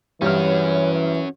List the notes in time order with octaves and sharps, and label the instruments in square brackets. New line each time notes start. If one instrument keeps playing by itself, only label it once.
[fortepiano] G2 F6 [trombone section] E3 [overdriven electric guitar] C#4 F#4 [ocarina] C#5